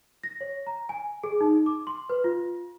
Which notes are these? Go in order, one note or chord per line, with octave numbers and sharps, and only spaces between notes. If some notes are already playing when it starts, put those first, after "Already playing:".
A#6
C#5
A#5
G#5
G#4
D#4
D6
C6
B4
F4